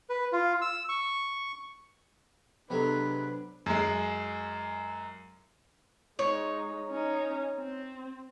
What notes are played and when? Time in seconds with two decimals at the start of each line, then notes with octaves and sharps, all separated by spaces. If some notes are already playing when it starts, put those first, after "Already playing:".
0.10 B4
0.32 F4
0.62 E6
0.89 C#6
2.70 C3 F#3 G#3 B3 D4 A4 B4
3.66 F#2 G#3
6.19 G#3 D#4 C#5
6.90 C#4 D#4
7.59 C4